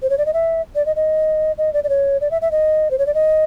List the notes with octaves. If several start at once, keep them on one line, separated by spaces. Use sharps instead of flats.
C5
C#5
D5
D#5
E5
D5
D#5
D#5
D#5
D5
D5
C#5
D5
E5
E5
D#5
C5
C#5
D5
D#5